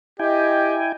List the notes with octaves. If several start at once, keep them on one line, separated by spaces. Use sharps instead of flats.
E4 G4 D#5 G5 G#5